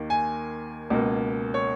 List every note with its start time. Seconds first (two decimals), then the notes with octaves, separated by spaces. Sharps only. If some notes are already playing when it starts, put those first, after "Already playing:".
Already playing: D#2 D#3 A#3
0.10 G#5
0.90 C#2 B2 A#3
1.54 C#5